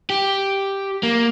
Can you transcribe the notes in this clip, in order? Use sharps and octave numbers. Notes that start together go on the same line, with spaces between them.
G4
A#3